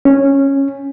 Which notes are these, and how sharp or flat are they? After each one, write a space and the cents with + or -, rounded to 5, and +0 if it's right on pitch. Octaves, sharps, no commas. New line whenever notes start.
C#4 -10